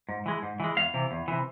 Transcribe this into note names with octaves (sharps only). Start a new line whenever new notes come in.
G#2
E3 G#3
G#2
E3 G#3
E2 F5
C3 E3
E2
C3 E3